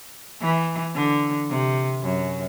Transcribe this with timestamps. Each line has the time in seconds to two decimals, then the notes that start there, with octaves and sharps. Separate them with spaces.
0.41 E3
0.95 D3
1.49 C3
2.03 F#2